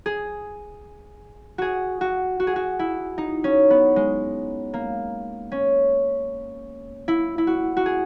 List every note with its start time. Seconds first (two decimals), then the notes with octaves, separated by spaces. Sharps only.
0.06 G#4
1.58 F#4 G#4
2.01 F#4
2.40 F#4
2.47 G#4
2.56 F#4
2.79 E4
3.18 D#4
3.44 C#4
3.70 B3
3.96 G#3
4.74 A#3
5.52 C#4
7.08 E4
7.38 E4
7.47 F#4
7.77 F#4
7.86 G#4